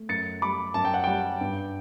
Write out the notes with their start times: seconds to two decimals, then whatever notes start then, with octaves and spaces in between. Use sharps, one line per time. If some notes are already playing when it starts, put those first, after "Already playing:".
Already playing: A3
0.09 F#2 A6 C#7
0.42 G3 B5 D6
0.74 F#2 A5
0.85 G5
0.94 F#5
1.04 G3 G5
1.41 G2